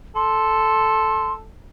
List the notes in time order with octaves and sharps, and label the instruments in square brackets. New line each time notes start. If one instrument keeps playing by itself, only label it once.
[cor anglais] A4 [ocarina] C6